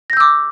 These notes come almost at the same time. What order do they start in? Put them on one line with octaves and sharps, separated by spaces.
A#6 G6 E6 D6